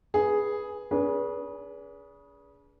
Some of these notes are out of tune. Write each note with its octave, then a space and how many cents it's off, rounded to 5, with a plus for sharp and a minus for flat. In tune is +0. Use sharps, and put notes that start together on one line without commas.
G#4 +0 B4 -10
D4 -45 G#4 +0 B4 -30